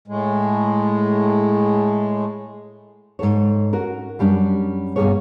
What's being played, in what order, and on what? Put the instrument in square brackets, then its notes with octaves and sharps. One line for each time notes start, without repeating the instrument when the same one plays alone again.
[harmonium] A2 G#3
[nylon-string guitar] G#2 C#3 A4 C#5
C#4 F#4 A#4
F#2 G3 C#4 D4
G2 B2 E3 A#3 G#4 C#5